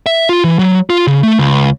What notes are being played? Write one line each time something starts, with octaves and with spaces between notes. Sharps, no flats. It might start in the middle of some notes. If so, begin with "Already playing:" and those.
E5
F4
E3
F#3
F4
C#3
A3
C#2